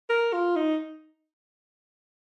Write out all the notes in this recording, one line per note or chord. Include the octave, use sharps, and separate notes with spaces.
A#4
F4
D#4